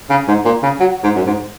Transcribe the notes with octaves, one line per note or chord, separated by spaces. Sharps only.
C#3
G#2
A#2
C#3
F#3
G#2
F#2
G#2